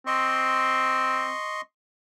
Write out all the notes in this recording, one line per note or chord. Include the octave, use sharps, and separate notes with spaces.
C4 D#5 C6 C#6